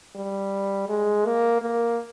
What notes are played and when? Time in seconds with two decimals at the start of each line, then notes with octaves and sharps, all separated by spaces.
0.16 G3
0.89 G#3
1.25 A#3
1.62 A#3